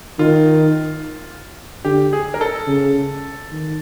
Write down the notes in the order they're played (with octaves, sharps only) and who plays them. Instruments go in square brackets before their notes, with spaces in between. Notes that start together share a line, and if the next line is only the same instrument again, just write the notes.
[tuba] D#3 [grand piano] F4
[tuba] D3 [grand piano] G4
[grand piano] G#4
A#4
A4
[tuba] C#3
D#3